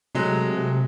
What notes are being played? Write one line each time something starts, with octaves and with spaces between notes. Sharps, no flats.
C3 F#3 G#3 A3